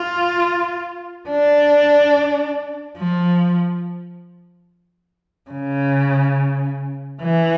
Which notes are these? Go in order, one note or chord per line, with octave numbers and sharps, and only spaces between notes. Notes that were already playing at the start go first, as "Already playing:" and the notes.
Already playing: F4
D4
F3
C#3
E3